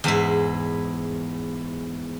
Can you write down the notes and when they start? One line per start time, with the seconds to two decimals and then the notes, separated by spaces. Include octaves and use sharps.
0.04 E2 G#2 E4